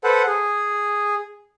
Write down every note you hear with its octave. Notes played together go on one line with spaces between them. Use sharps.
A4 B4 C5 F#5
G#4